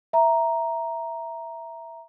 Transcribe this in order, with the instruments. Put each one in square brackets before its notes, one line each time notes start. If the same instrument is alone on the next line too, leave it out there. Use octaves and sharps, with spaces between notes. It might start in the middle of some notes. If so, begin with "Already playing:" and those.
[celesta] E5 A#5